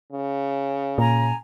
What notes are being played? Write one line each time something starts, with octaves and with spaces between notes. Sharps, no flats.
C#3
A#2 G#5 A#5